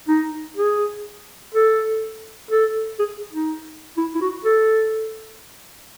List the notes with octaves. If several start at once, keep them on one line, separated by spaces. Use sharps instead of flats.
D#4
G#4
A4
A4
G#4
D#4
E4
E4
F#4
A4